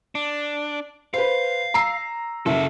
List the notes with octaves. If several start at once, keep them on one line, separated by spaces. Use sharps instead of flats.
D4
B4 C5 F5
A#5 E6 C7
F#1 F#4 A4 E5